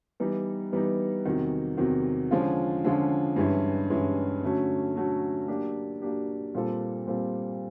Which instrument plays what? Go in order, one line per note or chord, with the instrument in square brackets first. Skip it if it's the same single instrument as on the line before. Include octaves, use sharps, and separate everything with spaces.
[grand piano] E3 G3 B3 D#4
E3 G3 B3 D#4
E2 C3 D#3 F#3
E2 C3 D#3 F#3
D3 F3 G#3 C#4 F4
D3 F3 G#3 C#4 F4
G2 E3 G#3 C#4 E4
G2 E3 G#3 C#4 E4
D3 F#3 A3 C#4 F#4
D3 F#3 A3 C#4 F#4
F#3 A#3 D4 G4
F#3 A#3 D4 G4
A#2 G3 C4 F4 A4
A#2 G3 C4 F4 A4